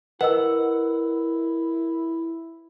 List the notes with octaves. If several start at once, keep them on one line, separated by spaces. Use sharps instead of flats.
E4 A#4 B4 D#5 F#5 E6